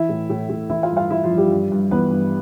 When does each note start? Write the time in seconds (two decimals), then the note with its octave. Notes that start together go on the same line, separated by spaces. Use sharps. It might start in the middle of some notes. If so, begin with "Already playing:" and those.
Already playing: E3 E4 E5
0.09 A2
0.30 A2
0.49 A2
0.70 E3 E4 E5
0.83 F4 F5
0.90 G2
0.97 F4 F5
1.10 E3 E4 E5
1.24 F3 F4
1.30 G2
1.37 G3 G4
1.51 G2
1.71 G2
1.91 E3 B3 B4
2.11 G2